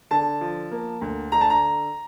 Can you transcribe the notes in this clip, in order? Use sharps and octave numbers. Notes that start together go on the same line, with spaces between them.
D3 A5
F3
A#3
D2
D3 A#5
A5
A#5